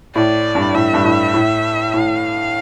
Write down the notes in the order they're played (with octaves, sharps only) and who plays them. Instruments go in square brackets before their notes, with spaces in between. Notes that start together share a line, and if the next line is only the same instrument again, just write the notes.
[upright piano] A2 [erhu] D5
[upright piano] G2
[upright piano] A2 [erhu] E5
[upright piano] G2
A2
A2
[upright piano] A2 [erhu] F5